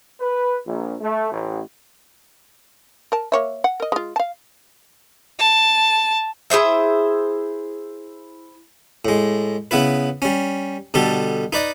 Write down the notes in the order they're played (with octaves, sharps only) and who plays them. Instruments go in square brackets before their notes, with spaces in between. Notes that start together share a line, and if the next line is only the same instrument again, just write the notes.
[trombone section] B4
A#1
A3
A1
[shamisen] A#4 A5
A#3 C#5 E5
F#5
A#4 D#5
G#3 F4
F5 A5
[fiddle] A5
[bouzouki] E4 G#4 C5 E5
[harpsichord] A2 G#3
C#3 B3 E4 B4
G3 C#4
B2 D3 G3 G4 A4
D#4 B4 D5 D#5